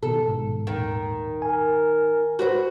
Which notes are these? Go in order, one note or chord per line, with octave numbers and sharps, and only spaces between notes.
B2 D#3 A4
A#1 G#2
D#1 D#2 D#3
A#4 G#5
F#4 B4 C5